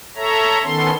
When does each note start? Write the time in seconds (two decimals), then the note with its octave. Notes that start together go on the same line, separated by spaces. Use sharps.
0.16 A4 C#5 E5 A#5
0.63 D#3 B3 C#4 A4 C6